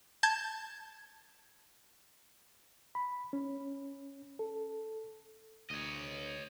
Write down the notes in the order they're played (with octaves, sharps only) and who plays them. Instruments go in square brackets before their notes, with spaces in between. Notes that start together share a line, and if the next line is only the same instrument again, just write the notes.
[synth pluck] A5 G6 G#6
[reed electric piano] B5
C#4
A4
[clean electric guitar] D2 [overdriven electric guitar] C#5 D#5